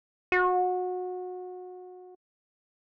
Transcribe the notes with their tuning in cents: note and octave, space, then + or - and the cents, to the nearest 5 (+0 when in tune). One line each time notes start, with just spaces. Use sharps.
F#4 -25